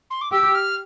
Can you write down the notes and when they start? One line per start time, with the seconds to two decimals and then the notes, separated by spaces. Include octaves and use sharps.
0.10 C6
0.21 D6
0.31 G4 E6
0.55 F6